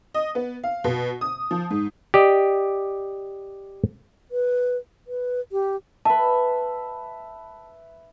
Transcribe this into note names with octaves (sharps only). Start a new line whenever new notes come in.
D#5
B3
F5
B2
D#6
F3
G#2
G4 D5 D#5
B4
B4
G4
B4 E5 A5